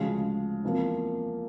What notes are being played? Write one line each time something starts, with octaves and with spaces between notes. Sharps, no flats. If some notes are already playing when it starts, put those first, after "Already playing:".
Already playing: D2 C#3 F3 G#3
E2 C3 F3 A#3